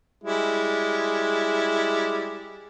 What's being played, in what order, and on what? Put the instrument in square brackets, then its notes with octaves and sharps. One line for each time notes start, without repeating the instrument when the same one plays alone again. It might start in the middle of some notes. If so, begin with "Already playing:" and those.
[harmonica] G3 G#3 E4